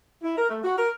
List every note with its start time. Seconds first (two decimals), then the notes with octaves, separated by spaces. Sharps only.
0.23 E4
0.37 A#4
0.49 A3
0.64 F#4
0.76 A#4